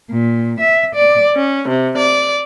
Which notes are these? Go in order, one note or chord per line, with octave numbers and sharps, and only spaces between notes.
A#2
E5
D5
C#4
C3
D5